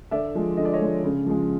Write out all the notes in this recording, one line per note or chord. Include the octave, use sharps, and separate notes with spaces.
D3 D5 E5
F3 G#3
D3 D#5
D5
C#5 D#5
F3 G#3
C#3
F3 G#3